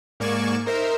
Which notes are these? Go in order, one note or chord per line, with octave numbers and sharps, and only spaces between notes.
G#2 A#3 D5 G#5 C#6 E7
D#4 A#4 C5 E5